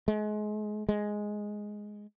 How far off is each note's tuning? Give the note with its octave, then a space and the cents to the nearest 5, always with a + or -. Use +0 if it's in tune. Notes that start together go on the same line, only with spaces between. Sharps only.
G#3 +30
G#3 +5